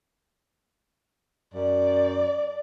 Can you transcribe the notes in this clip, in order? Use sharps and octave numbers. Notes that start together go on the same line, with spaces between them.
F#2 D5